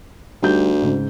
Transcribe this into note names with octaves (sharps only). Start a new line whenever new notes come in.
D2 G3 D#4 G6
G#2 C#3